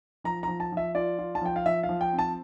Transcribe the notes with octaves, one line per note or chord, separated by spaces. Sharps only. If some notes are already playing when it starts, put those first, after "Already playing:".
F3 A#5
F3 A#5
A5
F3 E5
F4 D5
F4
A5
F3 G5
F5
F3 E5
F5
F3
G5
C4
A5